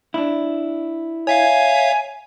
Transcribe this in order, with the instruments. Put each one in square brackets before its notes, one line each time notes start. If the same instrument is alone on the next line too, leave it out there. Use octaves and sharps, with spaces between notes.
[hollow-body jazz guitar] D4 E4
[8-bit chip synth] C#5 E5 F5 [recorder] G#5